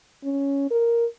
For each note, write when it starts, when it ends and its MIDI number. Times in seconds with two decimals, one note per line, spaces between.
0.24 0.66 61
0.71 1.06 70